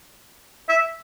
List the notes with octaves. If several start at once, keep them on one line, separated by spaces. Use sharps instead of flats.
E5